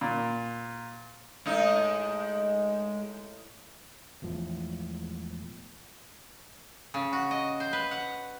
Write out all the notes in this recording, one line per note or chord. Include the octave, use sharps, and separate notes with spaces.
A#2
A2 G#3 D#4
E1 E2 A2 F3
C#3
F#4
D#5
C5
B4
F#5